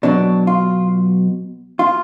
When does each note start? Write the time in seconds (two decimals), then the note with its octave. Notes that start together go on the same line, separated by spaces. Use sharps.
0.03 B2 F#3 D4
0.47 F4
1.79 F4